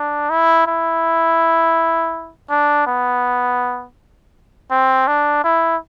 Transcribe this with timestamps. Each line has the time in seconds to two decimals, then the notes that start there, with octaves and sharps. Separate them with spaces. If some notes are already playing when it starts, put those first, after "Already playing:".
Already playing: D4
0.30 E4
0.66 E4
2.50 D4
2.87 B3
4.71 C4
5.07 D4
5.44 E4